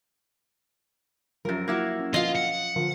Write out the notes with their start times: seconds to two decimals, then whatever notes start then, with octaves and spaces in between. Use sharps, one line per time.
1.45 F#2 F3 F#3 G4 A#4
1.68 A#3 E4 F#4
1.99 C#4
2.14 F3 F4 D#5 F5
2.36 F#5
2.76 D3 F3 A#4